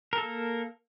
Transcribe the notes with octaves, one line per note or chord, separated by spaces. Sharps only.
A#3 A4 A#4